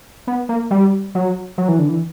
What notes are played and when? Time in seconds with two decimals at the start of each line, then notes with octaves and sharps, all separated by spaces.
0.27 B3
0.49 A#3
0.71 G3
1.15 F#3
1.58 F#3
1.68 E3
1.79 D3
1.89 E3